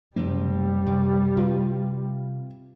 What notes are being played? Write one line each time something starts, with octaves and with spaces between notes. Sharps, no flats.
F#1 C3 G3 A3 A#3
C3
C3 F4 B4